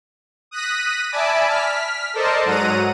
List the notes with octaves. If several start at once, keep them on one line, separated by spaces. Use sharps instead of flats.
D#6 F#6 A#6 B6 D#7
D5 E5 G#5 A5 B5 D6
F6 B6
A4 A#4 C5 D5 D#5 A5
G#2 F#3 F#5 A#5 D#7